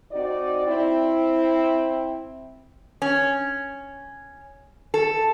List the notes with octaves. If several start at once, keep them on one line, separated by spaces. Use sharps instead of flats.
C4 D#4 F#4 D5
C4 E4
C#4
A4